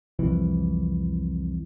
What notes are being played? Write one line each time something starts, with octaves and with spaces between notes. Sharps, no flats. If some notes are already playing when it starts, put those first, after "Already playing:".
C2 F2 E3